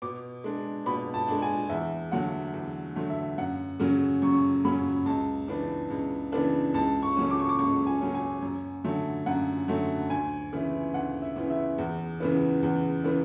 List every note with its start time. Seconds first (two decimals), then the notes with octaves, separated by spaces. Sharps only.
0.02 B2 D6
0.44 G#3 D4
0.86 B2 B5
1.14 A5
1.28 G#3 D4
1.42 G#5
1.69 E2 E5
2.12 D3 F#3 A3 F#5
2.54 E2
2.96 D3 F#3 A3
3.10 E5
3.38 F#2 F#5
3.80 C#3 F#3 C#4
4.22 F#2 C#6
4.65 C#3 F#3 C#4 B5
5.06 C#2 A5
5.48 C#3 E3 B3 D4
5.90 C#2
6.32 C#3 E3 B3 D4
6.74 C#2 A5
7.03 C#6
7.16 C#3 F#3 C#4
7.30 D6
7.40 C#6
7.49 D6
7.59 C#2 C#6
7.86 G#5
8.01 C#3 F#3 C#4
8.14 G#5
8.42 F#2
8.84 D3 F#3 A3
9.26 F#2 F#5
9.68 D3 F#3 A3
10.10 D2 G#5
10.53 C#3 E3 B3 E4
10.94 D2 F#5
11.22 E5
11.36 C#3 E3 B3 E4
11.50 E5
11.78 E2
12.20 C#3 E3 B3
12.63 E2
13.04 C#3 E3 B3